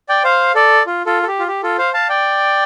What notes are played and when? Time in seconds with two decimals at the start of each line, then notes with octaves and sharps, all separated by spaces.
0.09 D5 G5
0.24 C5 F5
0.55 A4 D5
0.86 F4
1.06 F4 A4
1.22 A4
1.28 G4
1.39 F4
1.47 G4
1.63 F4 A4
1.78 C5 F5
1.94 F5 A5
2.09 D5 G5